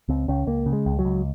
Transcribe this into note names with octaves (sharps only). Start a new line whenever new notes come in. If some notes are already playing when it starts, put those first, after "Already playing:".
C#2 C4
C#2 C#4
C#2 A#3
C#3
G#3
C#2
F#3
C#2